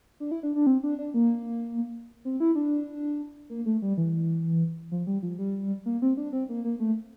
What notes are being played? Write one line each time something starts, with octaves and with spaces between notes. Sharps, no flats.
D4
E4
D4
D4
C4
D4
D4
A#3
C4
E4
D4
A#3
A3
G3
E3
F3
G3
F3
G3
A#3
C4
D4
C4
A#3
A#3
A3